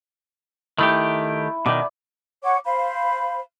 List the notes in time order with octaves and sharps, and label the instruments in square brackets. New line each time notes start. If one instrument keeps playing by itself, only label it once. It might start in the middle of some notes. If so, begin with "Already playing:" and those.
[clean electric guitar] D#3 A3 G4 [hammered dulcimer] E4
[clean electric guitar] B2 D#3 [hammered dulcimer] D5
[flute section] C#5 F#5 C#6 D6
C5 F5 B5